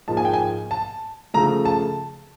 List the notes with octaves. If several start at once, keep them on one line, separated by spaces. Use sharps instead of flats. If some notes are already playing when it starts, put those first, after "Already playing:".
G#2 F3 A#3 A5
G#5
G5
G#5
A5
C#3 F3 A3 A#5
A5